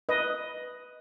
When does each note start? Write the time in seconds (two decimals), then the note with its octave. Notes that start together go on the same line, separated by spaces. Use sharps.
0.09 B4 D#5